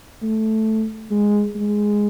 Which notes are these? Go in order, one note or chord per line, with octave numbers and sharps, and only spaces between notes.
A3
G#3
G#3